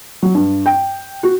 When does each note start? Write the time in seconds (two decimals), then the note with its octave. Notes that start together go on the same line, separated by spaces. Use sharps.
0.23 F#3
0.35 G2
0.66 G5
1.23 F#4